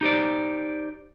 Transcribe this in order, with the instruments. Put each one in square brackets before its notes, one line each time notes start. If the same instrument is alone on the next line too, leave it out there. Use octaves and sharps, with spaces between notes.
[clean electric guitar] D#4 G4 C5 D5